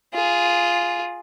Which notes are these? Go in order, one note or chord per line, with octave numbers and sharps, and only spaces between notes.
F4 G#4